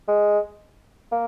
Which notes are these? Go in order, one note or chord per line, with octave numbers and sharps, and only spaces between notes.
G#3
A#3